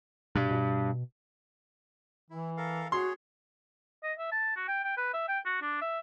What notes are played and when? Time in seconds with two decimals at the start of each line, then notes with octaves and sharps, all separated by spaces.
0.36 G2 B2
0.51 B2
2.30 E3 E4
2.57 A4 A#4 F5
2.92 F#4 G#4 C#5 C6
4.03 D#5
4.18 E5
4.32 A5
4.56 F#4
4.68 G5
4.84 G5
4.97 B4
5.14 E5
5.29 G5
5.46 F#4
5.62 D4
5.81 E5